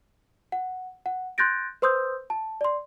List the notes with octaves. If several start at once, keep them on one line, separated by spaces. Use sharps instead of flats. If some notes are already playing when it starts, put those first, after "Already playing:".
F#5
F#5
C6 F#6 G6 A6 A#6 D7
B4 C5 C6 D#6 E6 G6
A5
D5 C6